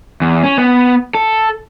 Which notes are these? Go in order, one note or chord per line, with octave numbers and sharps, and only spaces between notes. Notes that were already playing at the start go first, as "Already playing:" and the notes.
E2
C#4
B3
A4